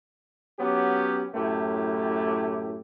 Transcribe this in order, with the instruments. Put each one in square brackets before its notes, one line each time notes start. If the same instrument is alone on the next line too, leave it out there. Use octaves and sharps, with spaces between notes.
[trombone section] F#3 B3 C#4 G4
F#2 A2 A3 E4 G4